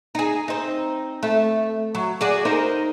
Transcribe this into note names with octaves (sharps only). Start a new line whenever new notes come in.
D#4 G#4
C4 D#4
A3
F#3
F#4 G#4 D5
D#4 A#4 C5